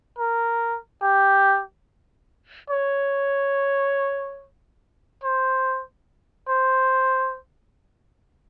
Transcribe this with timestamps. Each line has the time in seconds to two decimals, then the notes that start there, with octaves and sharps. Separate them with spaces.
0.19 A#4
1.02 G4
2.70 C#5
5.23 C5
6.48 C5